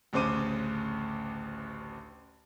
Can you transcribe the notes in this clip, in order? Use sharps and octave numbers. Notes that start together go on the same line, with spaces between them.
A1 D2 C#3 C5 D6 D#7